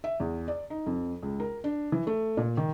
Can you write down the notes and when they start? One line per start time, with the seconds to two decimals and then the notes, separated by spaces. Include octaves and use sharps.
0.04 E5
0.20 E2
0.48 D5
0.70 D#4
0.86 F2
1.23 C#2
1.40 A#4
1.64 D4
1.92 E3
2.07 A3
2.37 A#2
2.57 D#3